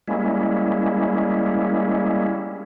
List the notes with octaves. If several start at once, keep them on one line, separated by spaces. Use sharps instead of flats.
G3 G#3 A#3 C#4 E4